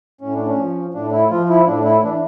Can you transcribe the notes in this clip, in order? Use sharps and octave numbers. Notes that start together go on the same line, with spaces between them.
A2 C#4
D4
C#4
F3
A2 D4
E4
F3 F4
E4
A2 D4
E4
E3 D4